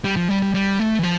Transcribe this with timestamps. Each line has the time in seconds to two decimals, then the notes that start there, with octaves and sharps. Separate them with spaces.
0.04 G3
0.16 F3
0.29 G3
0.42 G3
0.54 G3
0.79 A3
0.99 E3
1.03 F3